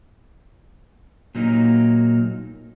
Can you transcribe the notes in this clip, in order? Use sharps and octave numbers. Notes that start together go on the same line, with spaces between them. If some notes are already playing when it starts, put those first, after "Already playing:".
A#2 F#3 A#3 D#4